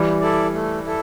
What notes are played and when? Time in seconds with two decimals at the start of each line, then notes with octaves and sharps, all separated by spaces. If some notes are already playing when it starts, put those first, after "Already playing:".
Already playing: E3 G3
0.21 E4 A4 D5
0.53 A3
0.85 E4 A4